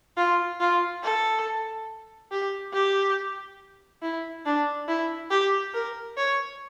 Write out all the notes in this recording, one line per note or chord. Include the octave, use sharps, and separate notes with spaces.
F4
F4
A4
G4
G4
E4
D4
E4
G4
A#4
C#5